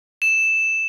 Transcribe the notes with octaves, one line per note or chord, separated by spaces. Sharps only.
E7